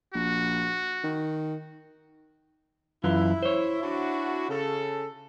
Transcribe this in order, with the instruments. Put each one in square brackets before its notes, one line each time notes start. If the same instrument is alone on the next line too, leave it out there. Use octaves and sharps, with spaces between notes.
[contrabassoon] A#1 [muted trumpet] F#4
[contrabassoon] D#3
[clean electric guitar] F#2 E3 F4 [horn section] E4
[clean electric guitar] C5 C#5
[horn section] D4 E4 F#4
C#3 A4